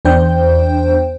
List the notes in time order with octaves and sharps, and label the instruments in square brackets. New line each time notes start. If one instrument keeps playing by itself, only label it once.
[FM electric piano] E2 D4 C5 G5 G6